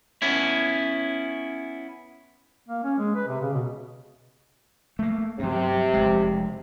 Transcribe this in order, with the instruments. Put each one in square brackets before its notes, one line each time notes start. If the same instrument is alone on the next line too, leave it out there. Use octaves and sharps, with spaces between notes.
[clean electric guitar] B3 C#4 E4
[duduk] A#3
C#4
G#3
B4
C3
C#3
B2
[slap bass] A3 A#3
[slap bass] G2 F#3 [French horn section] C3
[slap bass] F1 G#3